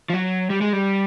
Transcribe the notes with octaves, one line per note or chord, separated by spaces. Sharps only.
F3
F#3
G3
G#3
G3